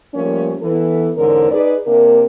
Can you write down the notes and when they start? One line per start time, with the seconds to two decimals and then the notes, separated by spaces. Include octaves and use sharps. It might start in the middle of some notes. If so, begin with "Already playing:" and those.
0.14 F3 G3 A3 A#3 C#4
0.61 E3 B3 A4
1.16 E2 G#2 D3 G#3 C#4 A#4
1.51 D#4 G#4 B4 D5
1.86 C3 A#3 D4 A#4